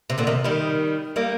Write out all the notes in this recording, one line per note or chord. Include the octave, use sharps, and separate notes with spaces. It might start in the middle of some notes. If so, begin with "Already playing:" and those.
C3
A#2 D3
C3 D#3
D#3 G3
G3 A#3